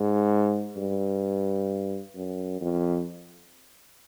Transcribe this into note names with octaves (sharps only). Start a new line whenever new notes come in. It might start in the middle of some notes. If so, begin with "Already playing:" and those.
Already playing: G#2
G2
F#2
F2